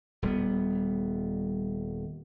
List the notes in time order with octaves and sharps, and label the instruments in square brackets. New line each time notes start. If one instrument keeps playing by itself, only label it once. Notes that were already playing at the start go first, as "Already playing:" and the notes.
[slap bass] D#1 G3 B3